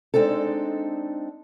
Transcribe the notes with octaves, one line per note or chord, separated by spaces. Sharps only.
G#3 C4 D4 D#4 A4